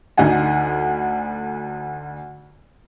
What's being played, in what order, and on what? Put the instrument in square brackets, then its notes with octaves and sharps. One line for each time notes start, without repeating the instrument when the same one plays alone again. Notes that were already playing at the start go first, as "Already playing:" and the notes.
[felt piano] D2 D3 D#4 F#5 G#5